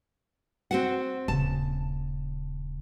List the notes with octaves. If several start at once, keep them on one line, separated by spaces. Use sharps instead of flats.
C4 F#4 F#5
D#1 C#3 A5